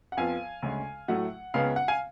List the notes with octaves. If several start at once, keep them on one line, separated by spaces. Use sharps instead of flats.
F#5
F2 F3 B3 F5 G#5
D2 C#3 G#3
A2 F#3 A3 F#5
C#2 C#3 G#3 B3 F5
F#5
F5 G#5